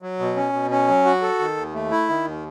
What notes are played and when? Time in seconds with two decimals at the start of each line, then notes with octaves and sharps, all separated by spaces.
0.02 F#3
0.19 B2
0.36 C#4
0.53 B2
0.71 C#4
0.88 F#3
1.05 F#4
1.22 A4
1.39 D#3
1.57 D#2
1.74 A3
1.91 E4
2.09 D#3
2.25 D#2